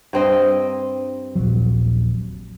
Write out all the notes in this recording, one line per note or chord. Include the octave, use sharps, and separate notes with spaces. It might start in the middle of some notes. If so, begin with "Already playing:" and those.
G2 C4 D#5
D#1 A#1 F#3